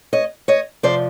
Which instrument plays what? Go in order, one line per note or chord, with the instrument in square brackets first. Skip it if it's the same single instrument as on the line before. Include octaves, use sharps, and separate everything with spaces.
[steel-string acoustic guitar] C#5 D#5
C#5 D#5
F2 C3 F3 C5 D5